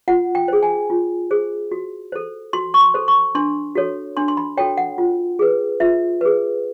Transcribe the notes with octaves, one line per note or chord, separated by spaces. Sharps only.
F4 F#5
G5
G#4 C5
G#5
F4
G#4 C5
F#4
A4 C5
F#4 C6
C#6
C6
A4 C5
C#6
D4 C6
F#4 A4 C#5
D4 C6
C6
B5
F#4 A4 C#5 G5
F#5
F4
G#4 B4
F4 E5
G#4 B4